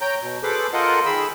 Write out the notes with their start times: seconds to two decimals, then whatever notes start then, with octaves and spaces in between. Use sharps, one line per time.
0.01 C#5 G5 A#5 G6
0.22 B2
0.43 G#4 A4 B4 C5 B5 D6
0.73 F4 A4 A#4 C5 D#5 F#5
1.06 D#3 G#4 B5 E6